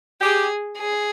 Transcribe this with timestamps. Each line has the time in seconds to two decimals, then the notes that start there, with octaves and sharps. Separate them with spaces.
0.21 G4 G#4
0.77 G#4